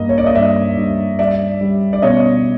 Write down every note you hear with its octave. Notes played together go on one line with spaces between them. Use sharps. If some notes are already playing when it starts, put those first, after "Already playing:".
Already playing: G2 A#3 D#5
C#5
D5
D#5
G2 D5 E5
G2
G3 D5 E5
G3
D5
B2 C#5 D#5